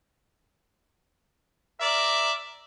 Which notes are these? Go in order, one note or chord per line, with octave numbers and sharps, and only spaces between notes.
A#4 D5 E5